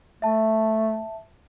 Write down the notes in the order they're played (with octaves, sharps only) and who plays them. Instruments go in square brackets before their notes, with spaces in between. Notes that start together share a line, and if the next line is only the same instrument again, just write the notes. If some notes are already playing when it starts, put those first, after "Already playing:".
[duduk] A3 [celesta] E5 A5